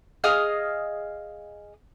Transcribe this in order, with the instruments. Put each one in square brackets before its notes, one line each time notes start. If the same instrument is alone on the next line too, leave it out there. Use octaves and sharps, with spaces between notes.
[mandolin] G#4 D#5 F5 F6